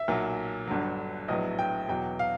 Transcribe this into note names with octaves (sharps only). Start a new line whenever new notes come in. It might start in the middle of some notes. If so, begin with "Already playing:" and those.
Already playing: E5
B1 A#2 F#3
G1 G2 D3 F#3
A#1 A2 F#3 B3 D#5
G5
E2 B2 F#3 G5
F5